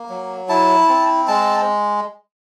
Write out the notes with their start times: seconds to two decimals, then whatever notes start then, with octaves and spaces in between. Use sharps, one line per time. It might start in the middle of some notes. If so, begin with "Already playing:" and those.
Already playing: A#3
0.09 F#3
0.49 E4 A5
0.89 C4
1.28 G#3 A5